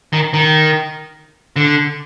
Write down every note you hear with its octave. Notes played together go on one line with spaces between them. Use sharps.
D#3
D#3
D3